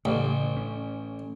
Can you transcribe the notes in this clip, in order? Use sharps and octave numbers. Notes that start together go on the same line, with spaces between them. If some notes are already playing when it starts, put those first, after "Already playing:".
A1 C#3
C#4